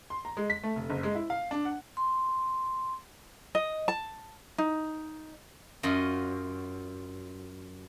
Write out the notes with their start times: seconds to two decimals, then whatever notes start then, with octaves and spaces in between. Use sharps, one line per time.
0.10 C6
0.25 A#5
0.37 G#3
0.50 B6
0.63 A3
0.76 F1
0.90 F#1
1.03 G#3
1.15 E4
1.30 F5
1.51 D4
1.65 F#5
1.97 C6
3.55 D#5
3.88 A5
4.58 D#4
5.83 F#2 F4 D#5